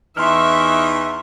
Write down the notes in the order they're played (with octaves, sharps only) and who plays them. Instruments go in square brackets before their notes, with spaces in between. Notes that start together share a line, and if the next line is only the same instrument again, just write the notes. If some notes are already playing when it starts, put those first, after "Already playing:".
[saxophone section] E2 E3 D#4 [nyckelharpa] E5 C#6 [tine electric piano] C6 F6